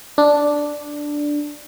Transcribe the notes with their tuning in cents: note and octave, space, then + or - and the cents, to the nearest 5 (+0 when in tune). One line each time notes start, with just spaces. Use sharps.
D4 +0